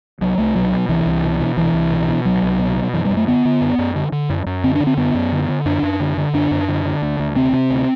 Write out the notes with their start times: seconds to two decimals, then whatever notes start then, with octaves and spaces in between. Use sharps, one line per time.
0.21 C2 F#3
0.38 C2 A3
0.55 B2 F#3
0.73 B2
0.89 C2 E3
1.06 C2
1.24 B2
1.40 B2
1.57 C2 E3
1.74 C2
1.91 B2
2.08 B2
2.25 C2 F#3
2.43 C2
2.59 B2
2.76 B2
2.93 F#2 E3
3.05 F#2 G3
3.17 A3
3.27 D3 B3
3.45 D3
3.61 F#2
3.79 F#2
3.95 D3
4.12 D3
4.30 F#2
4.46 F#2
4.64 D3 C4
4.75 D4
4.80 D3
4.87 C4
4.97 F#2 B3
5.15 F#2
5.32 D3
5.49 D3
5.65 F#2 D4
5.83 F#2
6.00 D3
6.17 D3
6.34 F#2 D4
6.51 F#2
6.68 D3
6.85 D3
7.02 D2
7.20 D2
7.35 C3 C4
7.53 C3
7.70 D2